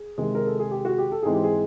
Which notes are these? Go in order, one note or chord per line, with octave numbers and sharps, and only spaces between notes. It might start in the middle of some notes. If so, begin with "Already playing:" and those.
Already playing: G#4
C3 D#3 G#3
A#4
A4
G#4
G4
F#4
G4
A4
G#2 E3 G#3 C4 D#4 G#4
G4
G#4